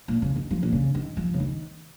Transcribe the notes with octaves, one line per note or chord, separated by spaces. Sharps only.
A#2
C#3
D#3
F3
A#2
C#3
D#3
F3
C#3
D#3